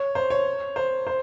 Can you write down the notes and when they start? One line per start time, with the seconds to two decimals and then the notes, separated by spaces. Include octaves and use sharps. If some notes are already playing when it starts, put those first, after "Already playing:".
Already playing: C#5
0.15 C5
0.30 C#5
0.76 C5
1.07 C5